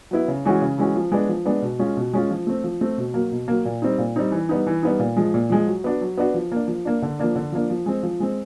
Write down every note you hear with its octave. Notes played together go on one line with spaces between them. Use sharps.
F#3 B3 E4
C#3
E3 G#3 C#4 F#4
C#3
E3 G#3 C#4 F#4
F3
G#3 B3 D4
F3
G#3 B3 D4
B2
G#3 C#4 F4
B2
G#3 C#4 F4
F3
A3 C4
F3
A3 C4
B2
F#3 A#3
B2
F#3 A#3
A#2
G3 C4 D#4
A#2
G3 C4 D#4
E3
G3 B3 D#4
E3
G3 B3 D#4
A#2
F3 G#3
A#2
F3 G#3
F#3
B3 D4 F#4
F#3
B3 D4 F#4
F3
A#3 D4
F3
A#3 D4
D3
F3 A#3 D4
D3
F3 A#3 D4
F3
G#3 C4
F3
G#3 C4